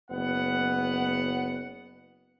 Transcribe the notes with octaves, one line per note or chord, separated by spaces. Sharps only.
F#1 B3 F#5